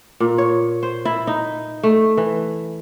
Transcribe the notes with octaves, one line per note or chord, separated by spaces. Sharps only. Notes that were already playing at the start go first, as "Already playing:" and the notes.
A#2
C#5
C5
E4
D#4
A3
E3